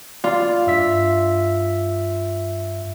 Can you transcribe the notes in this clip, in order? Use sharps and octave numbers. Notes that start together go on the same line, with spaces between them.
F4 D5
G2 E5 B6